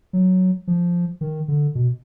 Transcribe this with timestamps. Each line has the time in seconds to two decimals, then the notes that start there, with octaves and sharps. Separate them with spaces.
0.13 F#3
0.67 F3
1.21 D#3
1.48 D3
1.75 B2